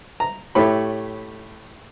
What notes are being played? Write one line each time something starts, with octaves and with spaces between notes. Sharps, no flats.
A#5
A2 A3 G4 C#5 B5